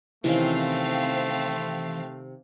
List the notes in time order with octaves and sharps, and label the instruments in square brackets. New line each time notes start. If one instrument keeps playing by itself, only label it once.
[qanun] C3 D#3 C#4 [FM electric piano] E3 [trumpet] A3 [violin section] C4 F5